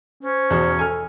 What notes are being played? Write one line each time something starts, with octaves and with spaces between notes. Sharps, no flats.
C#4 C5
E2 B2 C#6
A4 G#5 F6